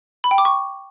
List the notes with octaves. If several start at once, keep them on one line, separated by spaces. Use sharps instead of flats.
B5
G5
D6
C#6